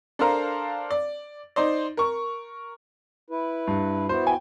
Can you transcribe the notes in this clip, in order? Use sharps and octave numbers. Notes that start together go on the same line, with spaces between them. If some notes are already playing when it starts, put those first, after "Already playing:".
D4 A4 A#4 C5 F5 A#5
D5
D#4 C5 D5
A#4 C#6
E4 B4
G2
B3 E4 F#4 C5
G5 G#5